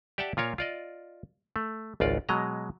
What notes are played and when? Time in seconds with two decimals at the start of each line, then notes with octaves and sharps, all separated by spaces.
0.18 G4 D5 E5 F#5 G5 A5
0.37 A#2 F4 A#4 C#5 F5
0.58 F4 D5 D#5
1.56 A3
2.00 G#1 C#2 F4 D5
2.29 B2 F#3 G#3 D#5 A#5